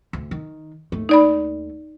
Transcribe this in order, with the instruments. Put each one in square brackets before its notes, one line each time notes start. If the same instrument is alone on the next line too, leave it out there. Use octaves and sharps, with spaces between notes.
[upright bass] D2
D#3
D#2 A3
[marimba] D#4 D5 B5